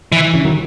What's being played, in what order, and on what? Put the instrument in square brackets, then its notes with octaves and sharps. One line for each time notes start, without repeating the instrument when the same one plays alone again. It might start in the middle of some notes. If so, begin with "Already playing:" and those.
[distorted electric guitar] E3
[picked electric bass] C#3 E3
D#3 F#3